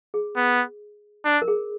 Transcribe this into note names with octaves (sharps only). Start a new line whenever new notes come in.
G#4
B3
D4
A#4
G#4